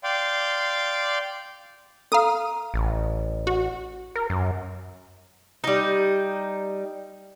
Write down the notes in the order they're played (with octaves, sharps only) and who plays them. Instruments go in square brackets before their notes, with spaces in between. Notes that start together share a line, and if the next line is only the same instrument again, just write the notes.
[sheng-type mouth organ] D5 F5 G5 C6
[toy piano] A4 A#5 [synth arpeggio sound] F5 D#6
[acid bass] A1
[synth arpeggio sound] F#4
[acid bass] A#4
F#2
[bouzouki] G3 D#4